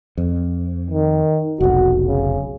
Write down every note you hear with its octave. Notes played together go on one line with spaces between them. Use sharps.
F2
D#3
F1 B1 F#4
C#3